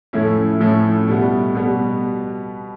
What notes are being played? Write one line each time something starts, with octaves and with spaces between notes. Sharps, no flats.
A2 F3 A3 C#4 E4
A2 F3 A3 C#4 E4
B2 G3 B3
B2 G3 B3